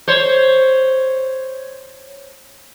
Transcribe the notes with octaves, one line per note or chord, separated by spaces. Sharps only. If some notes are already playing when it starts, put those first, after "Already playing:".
C5 C#5